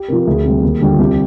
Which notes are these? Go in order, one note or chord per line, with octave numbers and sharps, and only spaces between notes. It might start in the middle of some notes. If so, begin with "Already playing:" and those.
Already playing: G4
C3 F3 A#4
A#4
D2 G#4
C3 G3
D#2
D3 G3
F4
C2 G4